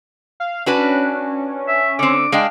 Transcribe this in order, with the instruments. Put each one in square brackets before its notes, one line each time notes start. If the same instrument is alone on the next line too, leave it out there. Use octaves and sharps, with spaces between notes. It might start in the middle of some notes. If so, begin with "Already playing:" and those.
[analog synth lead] F5
[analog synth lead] C#4 [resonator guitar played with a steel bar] D4 F#4 B4
[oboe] E5
[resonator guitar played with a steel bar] D3 C4 [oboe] D6
[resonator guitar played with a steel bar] G#3 D4 G5 [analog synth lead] F5